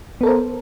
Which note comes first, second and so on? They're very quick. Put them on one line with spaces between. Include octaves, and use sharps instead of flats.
B3 A4 A#4 C5